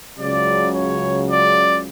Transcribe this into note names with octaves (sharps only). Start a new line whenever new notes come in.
C#2 C#3 F#3 D5
C#5
D5